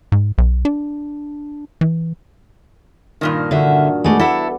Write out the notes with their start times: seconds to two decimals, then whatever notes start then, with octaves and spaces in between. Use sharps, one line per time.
0.12 G#2
0.38 B1
0.65 D4
1.81 E3
3.21 G2 A#2 D#3 D4
3.51 D3 D4 F#4 E5
4.04 G#3 A3 B3 D6
4.19 E4 A4 F#5